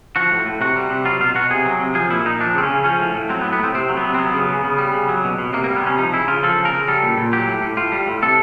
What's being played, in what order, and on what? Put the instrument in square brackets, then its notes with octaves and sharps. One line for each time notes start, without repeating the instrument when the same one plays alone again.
[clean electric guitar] F3 F#4
A2
A2
C3 F#4
G3
C3
F#3 F4
B2 F4
B2 F#4
C3 G#4
F#3
C3
F3 G#4
A#2 E4
A#2 D#4
F3 D4
C#3 C4
C#4
C#3
F3 C#4
A2
A2
F#3 C4
B3
A2
B3
A2 C4
C3 C4
F#3
B3
C3
C4
F#3 B3
C#3
C#3
C#3
G3
C#3
F#3
B2
B2
C3 A#3
A#3
G3
B3
C3 C#4
F3 D#4
C#3 E4
C#3 F4
F3 A4
C#3
A#4
C#3
G3 A4
A#2
A#2
F#3 G4
A2
A2
A2 F4
G3
A2
C3 A4